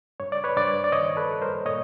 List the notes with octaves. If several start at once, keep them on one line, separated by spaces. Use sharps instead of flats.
G2 C#5
D5
B4 C#5
G2 C5 D5
D5
D#3 C#5 D#5
A4 B4
G3
A#4 C5
A#2 C#5 D#5